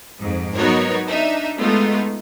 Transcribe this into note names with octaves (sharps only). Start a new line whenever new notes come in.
F2 G#2
F#3 B3 D#4 F#4 A#4 C#5
D4 D#4 E5
G#3 A3 B3 D#4 F4